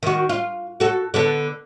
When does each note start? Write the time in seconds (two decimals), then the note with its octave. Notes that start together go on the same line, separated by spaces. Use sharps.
0.03 D#3 F#4
0.29 F4
0.80 F#4 A4
1.14 D3 B3 A4